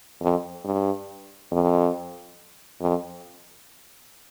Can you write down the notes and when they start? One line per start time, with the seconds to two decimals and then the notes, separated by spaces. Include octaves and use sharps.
0.21 F2
0.65 G2
1.51 F2
2.81 F2